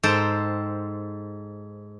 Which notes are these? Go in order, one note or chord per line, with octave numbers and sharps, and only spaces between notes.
G#2 A4 C5 G5